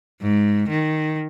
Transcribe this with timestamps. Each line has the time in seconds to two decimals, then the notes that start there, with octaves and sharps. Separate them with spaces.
0.21 G#2
0.69 D#3